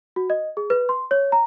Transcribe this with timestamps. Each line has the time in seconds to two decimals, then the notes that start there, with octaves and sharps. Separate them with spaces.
0.16 F#4
0.30 D#5
0.57 G#4
0.70 B4
0.89 C6
1.11 C#5
1.32 A#5